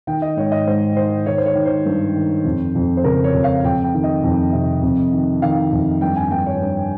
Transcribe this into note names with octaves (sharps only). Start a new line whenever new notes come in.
D#3 G5
D#5
G#2 C#5
D#5
G#2 C5
D#3 C5
D#3 C#5
C5
C#5
D#3
C5
G2
D#3
F2
F2
C5
C#3 A#4
C#5
F2
F5
F2 G5
G5
D#3
D#5
F2
C3
F2
D#3
D#3 F5
F2
G2 G5
G#5
G2 G5
C#5
G2